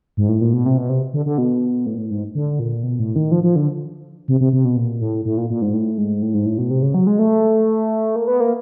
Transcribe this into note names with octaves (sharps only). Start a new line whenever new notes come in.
G#2
A2
A#2
B2
C3
B2
C3
D3
D3
B2
A2
A#2
A2
G#2
D3
A#2
B2
A2
D#3
F3
F3
D3
C3
C3
C3
B2
A#2
A2
A2
A#2
A#2
G#2
A2
G#2
A2
G#2
A2
B2
C3
C#3
F#3
G#3
A3
A#3
B3
A#3